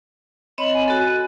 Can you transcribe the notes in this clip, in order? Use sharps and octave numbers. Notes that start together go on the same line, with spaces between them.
C4 C#5 D#5 B5
G#5
F#4 A4